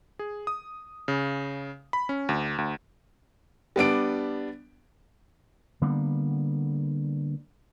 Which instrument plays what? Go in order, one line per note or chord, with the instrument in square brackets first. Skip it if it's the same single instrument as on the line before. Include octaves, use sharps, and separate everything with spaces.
[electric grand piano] G#4
D#6
C#3
B5
C#4
D2
D2
[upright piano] G3 B3 D4 D7
[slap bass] D3 G3 A#3 B3